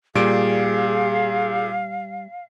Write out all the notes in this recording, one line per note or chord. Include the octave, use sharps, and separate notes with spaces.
A#2 G3 G#4 F5 D7